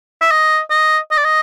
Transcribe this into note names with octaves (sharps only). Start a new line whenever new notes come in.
E5
D#5
D#5
D#5
D5
D#5